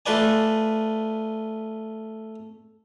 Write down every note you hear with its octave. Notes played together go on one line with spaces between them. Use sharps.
A3 F4 B4 D5 G#5